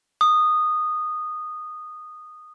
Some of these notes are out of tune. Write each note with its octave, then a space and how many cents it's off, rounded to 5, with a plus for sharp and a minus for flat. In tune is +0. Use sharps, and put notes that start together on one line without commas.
D#6 -15